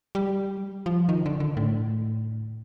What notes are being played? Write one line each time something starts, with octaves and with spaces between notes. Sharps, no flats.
G3
F3
D#3
D3
D3
A2